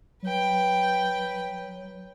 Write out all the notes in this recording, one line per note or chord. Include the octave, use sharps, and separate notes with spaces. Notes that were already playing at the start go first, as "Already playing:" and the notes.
F#3 B4 G5